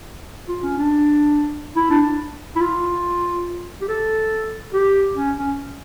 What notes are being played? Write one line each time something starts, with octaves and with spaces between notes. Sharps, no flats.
F4
C#4
D4
E4
D4
E4
F4
G4
A4
G4
C#4
C#4